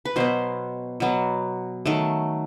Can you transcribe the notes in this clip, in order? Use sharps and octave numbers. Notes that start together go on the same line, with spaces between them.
B4
B2 F#3 B3 C5
B2 F#3 B3
D#3 F#3 A3